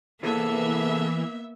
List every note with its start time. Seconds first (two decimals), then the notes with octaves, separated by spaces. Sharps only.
0.23 C3 E3 A#3 B3 G#4 A4 E5